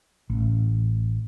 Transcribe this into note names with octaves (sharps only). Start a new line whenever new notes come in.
A1